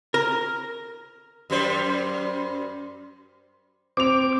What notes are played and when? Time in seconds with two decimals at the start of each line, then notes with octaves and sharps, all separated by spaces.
0.14 A#4
1.50 F#2 G3 C5
3.97 C4 D6 F7